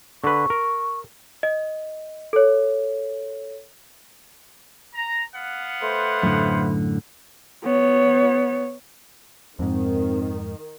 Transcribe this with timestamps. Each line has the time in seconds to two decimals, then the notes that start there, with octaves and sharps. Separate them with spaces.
0.24 D3 B4 C#6
0.50 A#4
1.43 D#5
2.33 A4 C#5
4.94 A#5
5.36 B3 F5 F#5
5.82 A3 B4 C5
6.23 F#2 A2 D3
7.64 B3 C#5
9.59 F2 G#2 D#3 C4